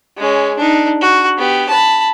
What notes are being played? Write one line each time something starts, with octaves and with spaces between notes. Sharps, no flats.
G#3 C#4
D4 D#4
F#4
B3 G4
A5 B5